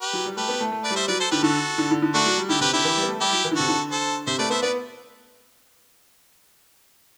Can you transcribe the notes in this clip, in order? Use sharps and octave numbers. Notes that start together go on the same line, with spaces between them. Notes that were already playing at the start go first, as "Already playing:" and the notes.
G4 B4
F#3
G3
A3 G4 B4
B3
A3
A3
B4 D5
G3
C5 E5
F#3 B4 D5
A4 C5
D3 G4 B4
D3 F#4 A4
D3
D3
D3
A3 D4 F#4
F#3
G3
D3 E4 G4
C3 G4 B4
D3 E4 G4
E3
G3
B3
A3
G3 E4 G4
F#3
E3
D3
C3 F#4 A4
D3
A4 C5
C3 C5 E5
A3 B4 D5
B3 C5 E5
B3 B4 D5